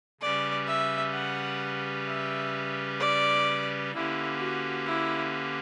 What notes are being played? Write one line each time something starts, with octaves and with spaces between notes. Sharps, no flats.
C#3 G3 C#4 G4 B4 D5
E5
F#5
E5
D5
D3 A#3 C#4 E4 G4 B4
F#4
E4